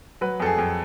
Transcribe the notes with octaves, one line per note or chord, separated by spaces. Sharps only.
F#3 B4
F2 A4
G#4
F2